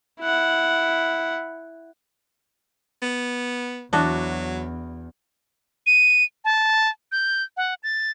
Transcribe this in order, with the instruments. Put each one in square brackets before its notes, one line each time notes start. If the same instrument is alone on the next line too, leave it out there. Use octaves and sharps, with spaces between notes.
[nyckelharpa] E4 F#5
[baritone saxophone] B3
[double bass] E2 [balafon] E3 A5 [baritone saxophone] F#3 [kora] D4 E4 F#4
[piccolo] D#7
A5
G6
F#5
A6